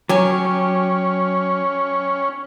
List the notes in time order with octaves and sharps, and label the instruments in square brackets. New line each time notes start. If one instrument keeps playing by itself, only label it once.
[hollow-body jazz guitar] F#3 [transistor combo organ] C#4 [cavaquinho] G4 C#5 G#5